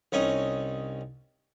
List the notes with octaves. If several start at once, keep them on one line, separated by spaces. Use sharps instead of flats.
C2 C#4 D#4